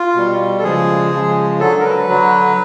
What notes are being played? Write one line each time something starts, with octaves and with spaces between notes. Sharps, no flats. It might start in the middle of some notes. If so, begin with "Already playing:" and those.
Already playing: F4
B2 G3
A4
C#3 F3 G#3 G#4
C#3 F3 G#3
D3 F#3 A4
A#4
B4
D3 F#3